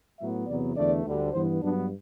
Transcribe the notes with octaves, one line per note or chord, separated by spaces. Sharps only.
A2 F#3 B3 E5
E2 C3 F#3 B3 D5
E2 D3 A3 D5
D2 D3 G3
G2 E3 B3 C5
G2 F#3 B3 D4